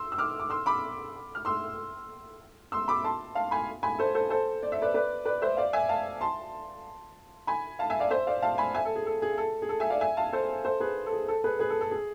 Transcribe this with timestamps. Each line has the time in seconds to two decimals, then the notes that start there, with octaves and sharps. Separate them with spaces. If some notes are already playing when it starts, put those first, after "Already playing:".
Already playing: C6 E6
0.12 E6
0.18 D6 F6
0.40 D6
0.50 C6 E6
0.66 B5 D6
1.35 F6
1.45 C6 E6
2.72 C6 E6
2.88 B5 D6
3.04 A5 C6
3.35 F5 A5
3.51 G#5 B5
3.83 G#5 B5
3.99 A4 C5
4.15 A4 C5
4.30 A4 C5
4.63 D5
4.72 E5
4.82 B4 D5
4.94 B4 D5
5.25 B4 D5
5.42 C5 E5
5.57 D5 F5
5.73 E5 G#5
5.89 F5 A5
6.21 A5 C6
7.47 G#5 B5
7.79 F5 A5
7.90 E5 G#5
8.00 D5 F5
8.10 C5 E5
8.27 D5 F5
8.42 F5 A5
8.58 G#5 B5
8.74 E5 G#5
8.85 A4
8.95 G#4
9.06 A4
9.22 G#4
9.38 A4
9.62 G#4
9.69 A4
9.80 E5 G#5
9.90 D5 F5
10.01 E5 G#5
10.17 F5 A5
10.33 A4 C5
10.65 A4 C5
10.80 G#4 B4
11.06 A4
11.13 G#4
11.28 A4
11.44 G#4 B4
11.59 G#4 B4
11.70 A4
11.81 A4
11.91 G#4